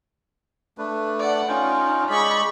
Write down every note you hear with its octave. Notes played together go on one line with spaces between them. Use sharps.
A3 D4 B4
D5 F#5
C#4 D#4 F4 G5
G#3 G#4 D5 B5 C#6